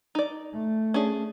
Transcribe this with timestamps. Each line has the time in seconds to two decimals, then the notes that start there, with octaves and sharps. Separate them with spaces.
0.15 D#4 D5
0.54 A3
0.94 C#4 D4 G#4